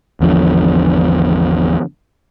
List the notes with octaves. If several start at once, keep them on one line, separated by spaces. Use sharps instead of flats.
G#1 E2 D3 F3